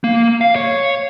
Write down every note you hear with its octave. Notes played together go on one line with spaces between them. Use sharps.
A#3
F5
C#5